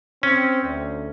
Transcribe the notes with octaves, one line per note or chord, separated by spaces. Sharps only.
C4 C#4
D2